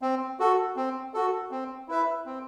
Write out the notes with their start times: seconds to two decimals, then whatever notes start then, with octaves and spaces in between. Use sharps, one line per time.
0.02 C4
0.39 F#4 A4
0.76 C4
1.14 F#4 A4
1.51 C4
1.88 E4 B4 E5
2.26 C4